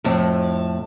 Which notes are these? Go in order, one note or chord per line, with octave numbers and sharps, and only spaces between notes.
F2 A2